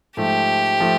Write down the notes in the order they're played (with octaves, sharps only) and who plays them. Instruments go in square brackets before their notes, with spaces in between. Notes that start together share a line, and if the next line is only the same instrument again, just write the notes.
[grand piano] G#2 F3 A3 [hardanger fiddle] G4
[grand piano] F3 A3